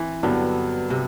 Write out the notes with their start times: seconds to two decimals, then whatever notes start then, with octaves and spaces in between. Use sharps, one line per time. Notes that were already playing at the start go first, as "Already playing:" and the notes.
Already playing: E3 C4
0.23 G2 D3 F#3 B3
0.90 C3